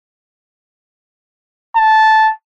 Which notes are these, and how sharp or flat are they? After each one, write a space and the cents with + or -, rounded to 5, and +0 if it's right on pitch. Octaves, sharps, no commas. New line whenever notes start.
A5 -10